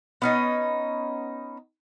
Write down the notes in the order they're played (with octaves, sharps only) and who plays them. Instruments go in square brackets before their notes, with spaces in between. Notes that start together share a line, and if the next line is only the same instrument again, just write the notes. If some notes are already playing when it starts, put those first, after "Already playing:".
[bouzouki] B3 C#4 D#4